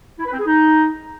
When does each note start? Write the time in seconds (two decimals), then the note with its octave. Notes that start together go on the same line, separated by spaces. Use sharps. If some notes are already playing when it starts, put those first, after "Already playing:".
0.19 E4
0.26 B4
0.32 C4
0.39 G#4
0.46 D#4